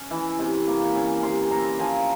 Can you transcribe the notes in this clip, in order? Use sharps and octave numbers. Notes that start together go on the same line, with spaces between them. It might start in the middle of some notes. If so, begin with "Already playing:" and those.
Already playing: C#4
E3
C3
A#3
C#4
C3 C6
C4 A#5
F3 G#5